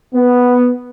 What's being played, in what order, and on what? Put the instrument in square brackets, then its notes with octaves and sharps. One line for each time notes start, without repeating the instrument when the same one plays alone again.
[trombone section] B3